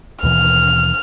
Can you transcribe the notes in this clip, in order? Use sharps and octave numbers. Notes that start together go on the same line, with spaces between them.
D#2 B2 E3 F6